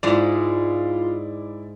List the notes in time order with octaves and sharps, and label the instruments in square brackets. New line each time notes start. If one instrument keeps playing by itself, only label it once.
[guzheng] G#2 G#3 [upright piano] E4 D5 [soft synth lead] F4